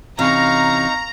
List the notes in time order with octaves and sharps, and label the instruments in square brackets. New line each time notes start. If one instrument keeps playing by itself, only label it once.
[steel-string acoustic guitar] C3 E3 C#4 [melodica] D#4 [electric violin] F5 C#6 [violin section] A#5